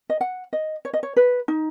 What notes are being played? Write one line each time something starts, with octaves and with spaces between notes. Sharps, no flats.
D#5
F#5
D#5
C#5
D#5
C#5
B4
D#4